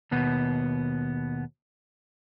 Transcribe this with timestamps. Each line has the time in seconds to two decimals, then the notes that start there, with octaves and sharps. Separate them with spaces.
0.11 D#2 B2 B3